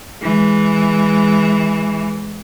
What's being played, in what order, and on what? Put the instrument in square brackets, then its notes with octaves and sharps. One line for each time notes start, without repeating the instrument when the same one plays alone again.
[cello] E3 G#3